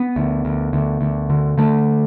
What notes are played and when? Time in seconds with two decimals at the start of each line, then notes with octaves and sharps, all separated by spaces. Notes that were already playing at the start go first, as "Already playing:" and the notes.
Already playing: B3
0.16 D2
0.45 D2
0.73 D2
1.01 D2
1.30 D3
1.58 D3 A3